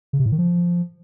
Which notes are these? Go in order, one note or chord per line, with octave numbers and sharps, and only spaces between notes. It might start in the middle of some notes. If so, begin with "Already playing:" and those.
C#3
C3
A2
D#3
F3